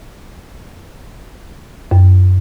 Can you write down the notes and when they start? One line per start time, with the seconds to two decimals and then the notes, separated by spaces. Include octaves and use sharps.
1.91 F#2